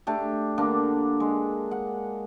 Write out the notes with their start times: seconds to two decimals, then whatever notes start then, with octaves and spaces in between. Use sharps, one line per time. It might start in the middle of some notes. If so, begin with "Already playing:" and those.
0.07 A3 D4 G4
0.58 D3 A#3 D4
1.20 G#3
1.71 F#5